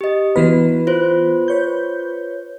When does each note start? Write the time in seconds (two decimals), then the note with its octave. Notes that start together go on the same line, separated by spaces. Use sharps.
0.01 G4 D#5
0.36 E3 B3 E4 F#4 B4
0.87 F4 C5
1.48 B4 C#5 G6